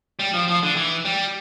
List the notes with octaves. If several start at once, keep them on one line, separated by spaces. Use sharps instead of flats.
G3
F3
F3
D3
E3
G3